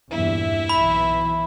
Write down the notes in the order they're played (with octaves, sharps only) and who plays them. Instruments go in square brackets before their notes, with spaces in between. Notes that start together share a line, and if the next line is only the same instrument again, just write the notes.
[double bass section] E2 G2 A#2 [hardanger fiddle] E4 E5
[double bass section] B1 E3 [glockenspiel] B5